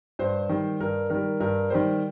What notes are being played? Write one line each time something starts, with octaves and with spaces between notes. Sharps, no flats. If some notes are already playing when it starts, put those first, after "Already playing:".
G2 C5
D#3 G3
G2 A#4
D#3 G3 A#4
G2 A#4
D#3 G3 C5